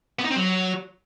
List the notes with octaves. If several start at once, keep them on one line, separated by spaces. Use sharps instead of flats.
B3
D#4
C4
F#3